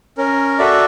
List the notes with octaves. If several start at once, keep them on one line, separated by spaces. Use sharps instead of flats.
C#4 A#4
F#4 A4 D5 E5